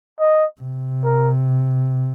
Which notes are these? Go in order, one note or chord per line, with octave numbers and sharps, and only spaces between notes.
D#5
C3
A#4